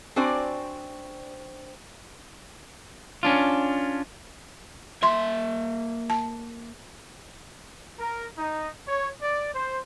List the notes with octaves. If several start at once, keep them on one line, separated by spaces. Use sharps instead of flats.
C4 D4 F#4 C5 D5 G#5
C#4 D4 F4
A#3 E5 C6
A5
A#4
D#4
C#5
D5
C5